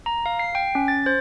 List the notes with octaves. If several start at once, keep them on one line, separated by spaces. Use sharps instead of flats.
A#5
F5
C7
G5
C#4
A6
C5